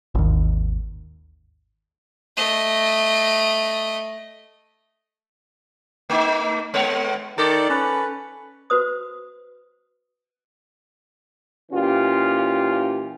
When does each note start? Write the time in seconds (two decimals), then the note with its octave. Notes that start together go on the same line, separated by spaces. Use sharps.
0.15 G#1 D#2
2.37 A3 D#5
6.10 A3 D#4
6.74 G#3 B3 C#5
7.38 D#3 A4 D5
7.70 C#4 B4
8.70 F#4 B4 C5 D#6
11.72 A#2 E3 C#4 F4 G4